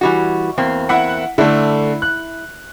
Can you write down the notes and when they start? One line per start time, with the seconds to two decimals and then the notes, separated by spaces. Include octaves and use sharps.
0.01 E3 G3 F#4
0.58 E2 A#3 C4
0.89 E4 E5 F#5
1.38 D3 A3 E4
2.02 F#6